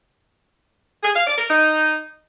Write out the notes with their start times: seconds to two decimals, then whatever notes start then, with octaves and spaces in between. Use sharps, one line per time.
1.03 G#4
1.15 F5
1.26 D5
1.37 A#4
1.49 D#4